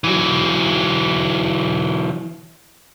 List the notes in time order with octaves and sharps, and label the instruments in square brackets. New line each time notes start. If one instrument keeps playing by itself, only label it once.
[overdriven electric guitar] E3 F#3